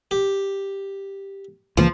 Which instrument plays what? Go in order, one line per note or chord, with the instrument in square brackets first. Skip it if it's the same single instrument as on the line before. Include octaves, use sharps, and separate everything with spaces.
[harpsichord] G4
[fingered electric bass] C#2 E3 A#3 [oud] F3